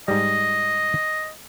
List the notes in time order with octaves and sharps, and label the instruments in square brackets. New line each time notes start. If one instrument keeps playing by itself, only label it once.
[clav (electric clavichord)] G#2 G3 [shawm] D#5